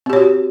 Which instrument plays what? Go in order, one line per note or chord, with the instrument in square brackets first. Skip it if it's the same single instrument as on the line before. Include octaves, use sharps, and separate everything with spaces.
[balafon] C4
G4
C#5
F#4